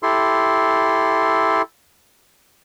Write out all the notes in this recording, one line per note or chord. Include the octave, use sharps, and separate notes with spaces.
E4 G4 A4 C6